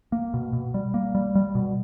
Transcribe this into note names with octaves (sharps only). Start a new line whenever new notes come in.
A#3
B2
B2
G3
A#3
G3
G3
B2